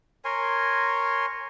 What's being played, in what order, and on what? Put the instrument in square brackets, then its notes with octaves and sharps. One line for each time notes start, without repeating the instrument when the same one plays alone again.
[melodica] A#4 C#5 G#5 C6